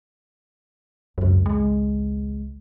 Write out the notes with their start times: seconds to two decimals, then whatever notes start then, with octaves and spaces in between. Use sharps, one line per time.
1.18 G#1 C#2 F#2
1.46 G#3